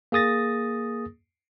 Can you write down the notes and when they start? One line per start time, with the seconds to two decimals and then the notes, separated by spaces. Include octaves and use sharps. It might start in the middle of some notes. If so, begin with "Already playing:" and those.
0.12 A#3 G#4 D#6 A6 A#6